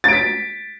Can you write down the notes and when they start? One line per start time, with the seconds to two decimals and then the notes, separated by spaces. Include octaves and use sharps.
0.04 A6
0.08 D7
0.13 B6